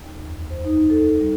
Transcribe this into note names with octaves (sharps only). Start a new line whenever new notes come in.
D#2
F2
C5
D#4
A4
G3